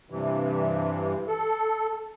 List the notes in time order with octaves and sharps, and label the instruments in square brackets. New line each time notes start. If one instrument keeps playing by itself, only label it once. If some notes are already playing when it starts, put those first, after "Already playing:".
[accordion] G2 C3 E3
A4